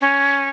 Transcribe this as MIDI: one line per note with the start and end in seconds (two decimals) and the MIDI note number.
0.01 0.49 61